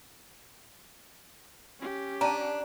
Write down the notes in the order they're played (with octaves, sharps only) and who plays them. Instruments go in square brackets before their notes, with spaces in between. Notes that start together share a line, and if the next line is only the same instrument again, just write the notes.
[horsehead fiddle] C#4 G4
[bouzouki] D4 [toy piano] A5 A#5